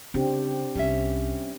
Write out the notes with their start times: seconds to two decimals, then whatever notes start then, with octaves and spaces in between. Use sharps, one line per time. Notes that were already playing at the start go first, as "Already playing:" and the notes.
0.14 C#3 C4 D4 G4
0.75 C2 G3 C#4 E5